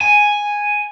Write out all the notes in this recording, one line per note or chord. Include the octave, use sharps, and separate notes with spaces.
G#5